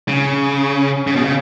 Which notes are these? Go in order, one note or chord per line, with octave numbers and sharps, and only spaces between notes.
C#3
C#3
B2
C#3